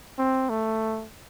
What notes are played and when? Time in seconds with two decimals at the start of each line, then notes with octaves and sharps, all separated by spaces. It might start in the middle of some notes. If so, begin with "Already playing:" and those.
0.18 C4
0.50 A3